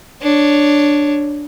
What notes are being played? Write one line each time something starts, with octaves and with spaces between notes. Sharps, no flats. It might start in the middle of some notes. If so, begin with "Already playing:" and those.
D4 C#5